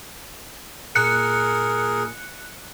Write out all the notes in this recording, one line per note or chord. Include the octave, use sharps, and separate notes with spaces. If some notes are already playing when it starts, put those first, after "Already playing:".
A#2 G#4 A#4 F#6 C#7